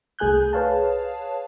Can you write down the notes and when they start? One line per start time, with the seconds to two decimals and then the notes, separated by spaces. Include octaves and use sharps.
0.19 C2 A3 G#4 G#5 F#6 G6
0.53 G#4 B4 C#5 F5 A5